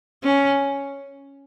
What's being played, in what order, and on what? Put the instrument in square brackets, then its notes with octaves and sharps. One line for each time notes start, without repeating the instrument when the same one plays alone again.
[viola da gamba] C#4